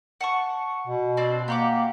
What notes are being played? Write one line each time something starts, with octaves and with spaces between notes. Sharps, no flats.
F#5 A5 C#6
B2
C4 D4 C5
A#3 G4 F#5 D6